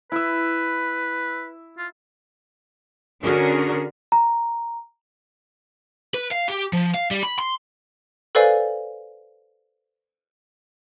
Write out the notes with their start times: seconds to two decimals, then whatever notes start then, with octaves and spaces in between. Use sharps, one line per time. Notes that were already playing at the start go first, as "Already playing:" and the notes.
0.12 E4 B4 E5
1.77 F4
3.22 D3 C#4 D4 F#4 G#4 A#4
4.12 A#5
6.14 B4
6.31 F5
6.48 G4
6.73 F3
6.94 F5
7.11 G3
7.23 B5
7.39 C6
8.35 A4 B4 C5 D5 F5 G#5